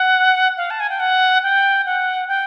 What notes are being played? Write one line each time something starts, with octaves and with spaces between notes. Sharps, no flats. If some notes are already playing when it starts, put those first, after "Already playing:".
Already playing: F#5
F5
A5
G#5
G5
F#5
G5
F#5
G5